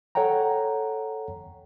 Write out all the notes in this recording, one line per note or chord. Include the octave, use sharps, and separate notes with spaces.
A4 C#5 F#5 G5 A#5